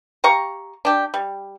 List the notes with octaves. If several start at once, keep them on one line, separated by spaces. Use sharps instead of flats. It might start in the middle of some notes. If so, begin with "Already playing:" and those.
G4 F5 A#5 C#6
D4 G4
G3